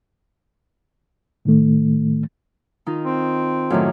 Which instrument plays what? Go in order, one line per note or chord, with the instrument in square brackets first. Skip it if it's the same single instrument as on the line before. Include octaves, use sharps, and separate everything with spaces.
[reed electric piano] A2 D#3 A3
[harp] D#3 D#4 F4
[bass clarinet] C4
[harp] F#2 A2 D#3